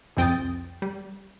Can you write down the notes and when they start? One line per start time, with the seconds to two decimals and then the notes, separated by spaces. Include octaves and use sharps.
0.17 C2 F2 C4 G5 D#6 A6
0.82 G3